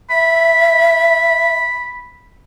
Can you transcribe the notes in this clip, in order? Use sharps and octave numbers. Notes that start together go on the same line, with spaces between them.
E5 B5